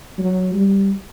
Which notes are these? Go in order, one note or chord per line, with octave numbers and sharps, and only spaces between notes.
F#3
G3